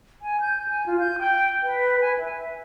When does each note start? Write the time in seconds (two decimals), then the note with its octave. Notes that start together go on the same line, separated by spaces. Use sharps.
0.22 G#5
0.41 G6
0.68 G#5
0.86 F4
1.00 G6
1.19 G5
1.63 B4
2.01 G#5
2.19 E5